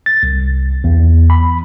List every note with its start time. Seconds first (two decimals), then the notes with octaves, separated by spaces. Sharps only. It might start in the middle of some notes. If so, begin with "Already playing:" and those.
0.06 A6
0.23 C2
0.84 E2
1.30 B5